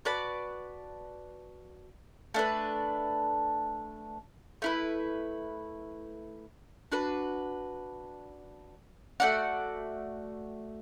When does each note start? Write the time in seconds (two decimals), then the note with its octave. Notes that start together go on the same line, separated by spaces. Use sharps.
0.05 F#4 B4 D5 A5
2.34 A3 D4 B4
4.62 A3 E4 B4
6.92 D4 F#4 B4
9.20 A3 F#4 D5 F#5